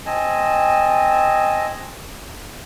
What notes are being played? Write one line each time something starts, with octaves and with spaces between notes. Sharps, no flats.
C4 D#5 G#5 A5